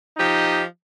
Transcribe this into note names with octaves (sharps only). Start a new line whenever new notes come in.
F3 D#4 G4 D#5